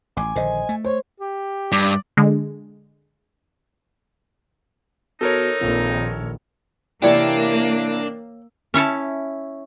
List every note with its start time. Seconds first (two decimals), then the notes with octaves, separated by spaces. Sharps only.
0.17 A1 G#5 D6
0.35 A#1 D3 D#3 C5 D#5
0.69 A3
0.84 C5 C#5
1.20 G4
1.72 G2 D5
2.17 D3 G#3
5.21 B2 D#4 A4 A#4 C#5
5.61 A#1 F2 A#2 D#3
7.02 C3 E3 A#3 D4 E4 C#5 D5 G5
8.74 C#4 E4 C#5 A5